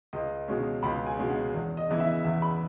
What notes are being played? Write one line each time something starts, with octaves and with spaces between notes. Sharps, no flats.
C#2 D#5
B2 G#3 C#4
C#2 B5
G#5
B2 G#3 C#4
F#5
E2
D#5
C#3 E3 B3 E4
E5
E2 E5
B5